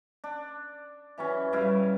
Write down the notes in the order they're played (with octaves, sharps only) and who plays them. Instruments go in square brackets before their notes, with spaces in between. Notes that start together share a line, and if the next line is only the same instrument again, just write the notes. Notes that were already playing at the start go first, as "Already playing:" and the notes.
[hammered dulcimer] D4
E3 F#3 C#4
[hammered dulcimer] C#3 E4 F5 [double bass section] G3